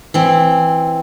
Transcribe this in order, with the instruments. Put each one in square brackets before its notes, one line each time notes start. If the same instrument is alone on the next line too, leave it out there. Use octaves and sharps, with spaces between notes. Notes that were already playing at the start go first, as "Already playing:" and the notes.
[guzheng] E3 C4